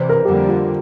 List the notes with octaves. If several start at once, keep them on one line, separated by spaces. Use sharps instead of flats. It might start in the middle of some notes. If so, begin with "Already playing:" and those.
Already playing: C3 E3 C5 D5
A#4
F2 D3 G3 A#3 G4
F4